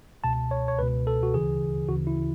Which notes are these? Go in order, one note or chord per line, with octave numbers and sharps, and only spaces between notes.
C#2 B2 A5
C#5
C#5
C#2 B2 B4
A4
F#4
D2 C#3 E3 G#4
D2 C#3 E3 F#4
E4